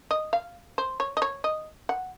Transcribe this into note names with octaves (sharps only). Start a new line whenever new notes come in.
D#5
F5
C5
C#5
D#5
C#5
D#5
F#5